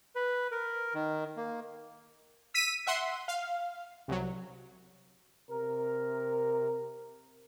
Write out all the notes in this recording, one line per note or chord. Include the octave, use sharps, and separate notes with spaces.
B4
A#4
D#3
A#3
E6 B6 D#7
E5 F#5 C6
F5
C2 F#3
C3 A#4